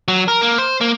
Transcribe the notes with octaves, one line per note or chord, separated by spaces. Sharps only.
F#3
A#4
A#3
C5
A#3